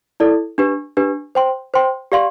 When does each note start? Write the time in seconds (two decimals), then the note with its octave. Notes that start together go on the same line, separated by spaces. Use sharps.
0.20 E4 A4 D5
0.58 D4 G4 B4
0.97 D4 G4 B4
1.35 C5 G5 C6
1.74 C5 G5 C6
2.12 G4 D5 F5 C6